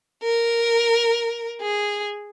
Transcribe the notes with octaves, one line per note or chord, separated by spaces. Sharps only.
A#4
G#4